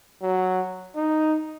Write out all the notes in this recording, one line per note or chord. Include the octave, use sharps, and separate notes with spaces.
F#3
D#4